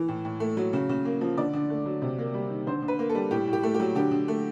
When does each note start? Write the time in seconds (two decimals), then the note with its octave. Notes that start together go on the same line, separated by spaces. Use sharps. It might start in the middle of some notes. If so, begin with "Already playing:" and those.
Already playing: E3
0.08 A2
0.25 A2
0.40 A3
0.57 F#3
0.73 C#3
0.89 C#3
1.05 A#3
1.21 F3
1.37 D3 D5
1.53 D3
1.70 A3
1.86 F#3
2.02 C3
2.18 A#3
2.34 G3
2.50 D#3
2.67 D3 C5
2.82 D3
2.88 B4
2.99 A#3
3.09 A4
3.15 G3
3.31 A2 G4
3.48 A2
3.53 G4
3.63 A3
3.74 G4
3.80 F#3
3.95 D3 G4
4.11 D3
4.28 A3